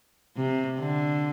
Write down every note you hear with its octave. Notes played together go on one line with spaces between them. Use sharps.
C3
D3